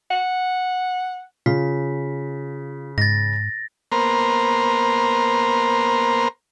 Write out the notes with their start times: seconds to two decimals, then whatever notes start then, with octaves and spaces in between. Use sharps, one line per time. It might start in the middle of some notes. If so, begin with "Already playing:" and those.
0.11 F#5
1.46 C#3 F4 B6
2.98 G#2 A6 A#6
3.92 A#3 B3 A#4 C5